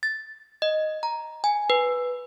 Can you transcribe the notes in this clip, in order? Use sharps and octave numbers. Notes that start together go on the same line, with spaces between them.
A6
D#5
A#5
G#5
B4